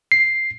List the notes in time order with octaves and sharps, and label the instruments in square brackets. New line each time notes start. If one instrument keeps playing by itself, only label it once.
[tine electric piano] C7